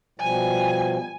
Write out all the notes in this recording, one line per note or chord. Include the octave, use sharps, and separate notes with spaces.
B2 F3 G3 G#5